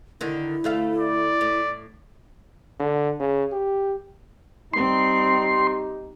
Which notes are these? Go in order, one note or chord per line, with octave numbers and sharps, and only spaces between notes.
D3 D#3 E4
D2 A3 F5
D5
A2
D3
C#3
G4
G3 C4 D#4 G4 C6